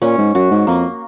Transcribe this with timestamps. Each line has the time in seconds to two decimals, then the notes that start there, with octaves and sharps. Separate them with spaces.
0.02 A#2 C#4
0.18 G#2
0.34 F#2 F#4
0.51 G#2
0.67 F2 A#3